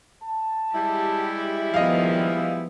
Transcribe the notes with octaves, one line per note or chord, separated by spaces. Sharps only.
A5
G3 G#3 E4 G4
A#1 G2 D#3 F3 B3 D#5 F5